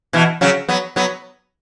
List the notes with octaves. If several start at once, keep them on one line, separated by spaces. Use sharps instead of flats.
B2 E3
C#3 F#3
F#3 B3
F#3 B3